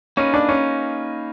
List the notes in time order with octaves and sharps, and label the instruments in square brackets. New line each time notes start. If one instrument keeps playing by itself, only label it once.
[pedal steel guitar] A#3 D#4 G#4 B4 [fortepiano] C#4
[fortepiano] D4
C#4